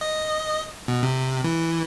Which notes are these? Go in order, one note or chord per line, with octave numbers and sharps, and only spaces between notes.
D#5
B2
C3
E3